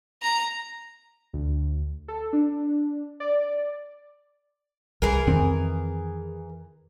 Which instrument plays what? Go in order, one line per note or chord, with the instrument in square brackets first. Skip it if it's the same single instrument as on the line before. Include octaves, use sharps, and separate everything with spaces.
[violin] A#5
[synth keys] D2
A4
D4
D5
[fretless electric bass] C2 [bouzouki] E3 G#4 A#4
[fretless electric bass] F2 D#3 C4